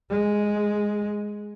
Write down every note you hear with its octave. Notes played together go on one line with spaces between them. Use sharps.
G#3